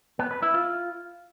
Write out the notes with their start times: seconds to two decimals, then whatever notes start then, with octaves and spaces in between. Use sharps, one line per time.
0.19 B3
0.31 B4
0.42 E4
0.54 F4